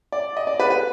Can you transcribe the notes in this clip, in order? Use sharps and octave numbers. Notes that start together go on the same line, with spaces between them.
D5
D#5
D5
B4
B4